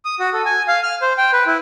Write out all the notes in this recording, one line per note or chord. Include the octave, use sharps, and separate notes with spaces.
D#6
F#4
A4
G#5
F5
F6
C5
G5
B4
E4